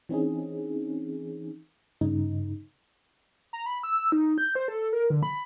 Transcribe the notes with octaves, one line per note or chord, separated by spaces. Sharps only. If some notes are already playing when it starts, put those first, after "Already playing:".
E3 C4 C#4 D#4 G#4
G2 C#3 D#4
A#5
B5
E6
D#4
G6
C5
A4
A#4
D3
B5